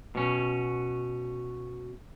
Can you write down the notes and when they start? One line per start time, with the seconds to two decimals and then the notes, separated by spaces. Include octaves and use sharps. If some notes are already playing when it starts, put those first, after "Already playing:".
0.15 B2 C#4